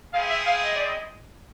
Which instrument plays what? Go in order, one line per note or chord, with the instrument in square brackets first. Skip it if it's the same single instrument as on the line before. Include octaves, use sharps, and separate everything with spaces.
[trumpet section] C4 E4 G#4 [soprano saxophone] F5
[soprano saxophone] E5
F5
D#5
D5
D#5